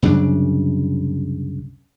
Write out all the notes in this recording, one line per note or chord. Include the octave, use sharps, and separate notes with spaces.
C2 F#2 C#3 D4